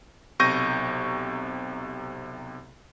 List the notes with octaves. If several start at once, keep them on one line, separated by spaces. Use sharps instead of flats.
B1 C3 C#6 G6 A#6 D#7